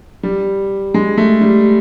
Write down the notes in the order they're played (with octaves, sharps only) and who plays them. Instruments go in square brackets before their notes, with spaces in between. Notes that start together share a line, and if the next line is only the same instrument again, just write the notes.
[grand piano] G3
G#3
A3
G3